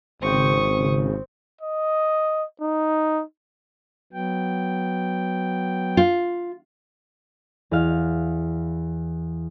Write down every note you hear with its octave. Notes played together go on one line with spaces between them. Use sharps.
G#1 C#3 C4 G5 C#6 D#6
D#5
D#4
F#3 B3 G5
F4
E2 F5